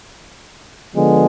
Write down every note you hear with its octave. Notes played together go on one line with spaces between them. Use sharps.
D3 F3 G#3 B3